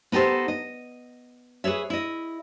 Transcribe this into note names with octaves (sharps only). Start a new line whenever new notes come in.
B3 D#4 G4 A4 C5
D#5
G#4 B4 C#5 E5
E4 D#5